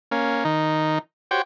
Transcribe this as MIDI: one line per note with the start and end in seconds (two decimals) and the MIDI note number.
0.11 0.44 58
0.11 0.44 61
0.45 0.99 51
0.45 0.99 63
1.31 1.42 66
1.31 1.42 67
1.31 1.42 72
1.31 1.42 73
1.31 1.42 79